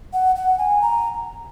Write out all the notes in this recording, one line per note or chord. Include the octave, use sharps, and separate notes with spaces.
F#5
F#5
G#5
A#5